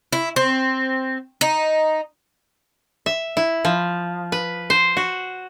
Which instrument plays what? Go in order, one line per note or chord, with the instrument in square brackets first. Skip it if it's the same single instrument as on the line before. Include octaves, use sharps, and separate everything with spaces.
[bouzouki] E4
C4
D#4
[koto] E5
E4
F3
B4
C5
F#4